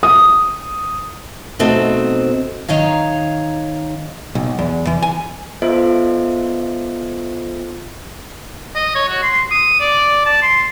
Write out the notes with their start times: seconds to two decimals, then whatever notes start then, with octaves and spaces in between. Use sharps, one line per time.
0.03 D#6
1.59 B2 A3 C4 D#4 F#4
2.68 D#3 D#4 C#5 F5
4.35 B1
4.59 E2
4.87 E3
5.03 G#5
5.62 B3 F4 A4 C5 D#5 E5
8.75 D#5
8.95 C#5
9.09 F#4
9.23 C6
9.51 D#6
9.80 D5
10.26 A5
10.42 C6